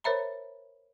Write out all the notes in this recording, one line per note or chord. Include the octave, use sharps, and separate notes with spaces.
A#4 C5 C#5 E5 A#5 B5